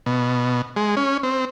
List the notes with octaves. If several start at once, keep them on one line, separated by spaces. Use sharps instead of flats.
B2
G#3
C#4
C4